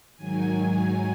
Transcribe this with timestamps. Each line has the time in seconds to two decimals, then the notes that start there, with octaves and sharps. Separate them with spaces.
0.16 G#2 D#3 F#3 G#5